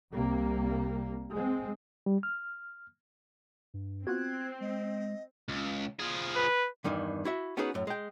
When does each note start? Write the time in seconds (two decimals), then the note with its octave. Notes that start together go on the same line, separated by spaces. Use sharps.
0.14 C2 C3 G3 A#3
1.34 G#3 C4
2.06 G3
2.23 F6
3.74 G2
4.07 B3 C4 F4 F#4 F#6 G#6
4.61 G#3 D#5
5.49 C#2
6.00 F3 G#4
6.36 B4
6.84 E2 G2 D#3 E3
7.25 E4 F#4 E5
7.57 B3 C#4 D#4 F#4 G#4 B4
7.74 F#2 A2
7.87 G#3 G5